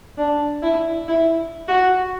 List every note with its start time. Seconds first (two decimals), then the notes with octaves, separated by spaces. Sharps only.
0.17 D4
0.63 E4
1.08 E4
1.68 F#4